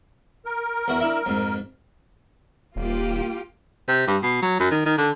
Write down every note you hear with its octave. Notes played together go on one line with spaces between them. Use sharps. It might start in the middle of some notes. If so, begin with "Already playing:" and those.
A#4
E2 F#4 E5
D4 E4 E5
F2 G#2
D#1 A#3 F4 G4
C3
G2
B2
F#3
F#2
D#3
D#3
D3